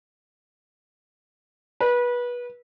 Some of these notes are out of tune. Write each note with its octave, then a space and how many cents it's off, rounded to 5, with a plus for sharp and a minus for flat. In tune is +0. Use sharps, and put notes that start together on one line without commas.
B4 -25